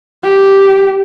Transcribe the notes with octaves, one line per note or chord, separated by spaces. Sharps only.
G4